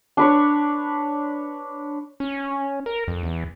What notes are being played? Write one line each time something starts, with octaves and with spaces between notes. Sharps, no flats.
D4 B4 C#5
C#4
A#4
F2
E2